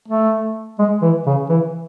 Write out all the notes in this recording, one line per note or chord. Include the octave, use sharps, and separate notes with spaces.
A3
G#3
E3
C#3
E3